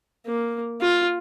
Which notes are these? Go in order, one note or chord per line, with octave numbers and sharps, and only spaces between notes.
A#3
F4